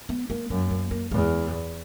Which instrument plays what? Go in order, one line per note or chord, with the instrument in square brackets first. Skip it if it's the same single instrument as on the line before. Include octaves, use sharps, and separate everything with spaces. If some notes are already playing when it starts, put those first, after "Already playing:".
[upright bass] B3
A#3
[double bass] F#2 [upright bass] A#3
[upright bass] A#3
A#3
[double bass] E2 [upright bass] G#3